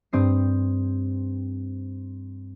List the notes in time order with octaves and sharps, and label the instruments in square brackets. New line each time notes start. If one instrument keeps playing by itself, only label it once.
[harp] G2 C4 D#6 C7